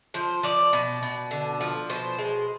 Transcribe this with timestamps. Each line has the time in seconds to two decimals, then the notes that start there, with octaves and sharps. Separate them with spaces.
0.14 F3 C5
0.43 F3 D5
0.73 B2
1.03 B2
1.31 D3
1.61 F3
1.90 B2 C5
2.19 G#3